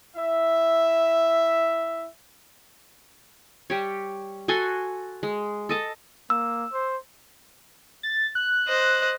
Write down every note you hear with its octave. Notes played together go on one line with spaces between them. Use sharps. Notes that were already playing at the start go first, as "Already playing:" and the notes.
E4 E5
G3 G4 C#5
F#4 A4 G#5 C6
G#3
A4 D#5 A5
A#3 E6
C5
A6
F#6
C5 D#5